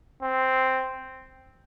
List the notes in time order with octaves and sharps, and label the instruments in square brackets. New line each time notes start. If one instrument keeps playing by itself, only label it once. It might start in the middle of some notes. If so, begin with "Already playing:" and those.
[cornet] C4